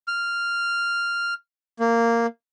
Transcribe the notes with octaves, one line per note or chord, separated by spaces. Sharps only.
F6
A#3